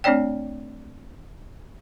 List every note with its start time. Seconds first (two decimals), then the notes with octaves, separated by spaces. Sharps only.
0.04 A3 C4 D4 C#5 D5 G5